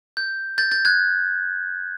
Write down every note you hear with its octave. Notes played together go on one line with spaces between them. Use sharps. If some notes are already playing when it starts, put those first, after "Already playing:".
G6
G6 A6
G6 A6
F#6 G#6